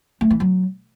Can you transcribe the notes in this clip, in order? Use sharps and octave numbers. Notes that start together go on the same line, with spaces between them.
A3
E3
F#3